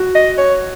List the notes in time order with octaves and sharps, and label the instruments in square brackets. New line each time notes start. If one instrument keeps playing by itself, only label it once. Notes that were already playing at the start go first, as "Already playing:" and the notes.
Already playing: [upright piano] F#4
[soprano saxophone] D#5
C#5